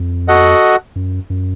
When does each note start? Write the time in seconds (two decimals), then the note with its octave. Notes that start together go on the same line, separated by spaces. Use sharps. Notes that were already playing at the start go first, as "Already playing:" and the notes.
Already playing: F2
0.28 F#4 A4 D#5 F#5
0.96 F#2
1.30 F#2